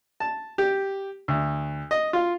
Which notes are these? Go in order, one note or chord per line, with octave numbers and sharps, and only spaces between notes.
A5
G4
D2
D#5
F4